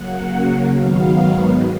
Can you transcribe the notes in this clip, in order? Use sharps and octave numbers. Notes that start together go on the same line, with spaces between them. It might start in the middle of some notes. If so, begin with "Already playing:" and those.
Already playing: C#3 F#3 A#3 F#5
G#2 D#3 F#3 B3 F5